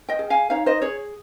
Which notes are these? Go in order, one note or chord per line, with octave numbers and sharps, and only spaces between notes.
D#5 G5
G#4
F5 G#5
D#4 C#5 F5
C5 D#5
G#4 C#5